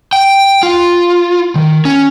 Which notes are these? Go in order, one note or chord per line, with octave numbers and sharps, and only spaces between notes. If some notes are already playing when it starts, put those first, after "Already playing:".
G5
F4
D#3
C#4